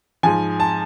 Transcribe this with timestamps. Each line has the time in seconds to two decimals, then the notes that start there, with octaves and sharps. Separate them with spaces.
0.23 G#2 F3 G#5
0.60 A5